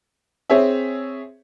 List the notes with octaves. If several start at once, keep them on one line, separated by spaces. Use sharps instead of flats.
C4 G#4 C5 C#5 E5